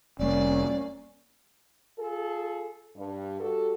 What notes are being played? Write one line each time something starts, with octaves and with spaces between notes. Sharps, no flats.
F1 G3 A#3 C#4 D5
F4 G#4 A4
G2
G3 F#4 A4